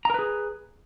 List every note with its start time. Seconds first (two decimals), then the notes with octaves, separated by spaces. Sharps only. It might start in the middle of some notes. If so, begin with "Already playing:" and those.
0.05 A#5
0.10 A#4
0.14 B4
0.19 G#4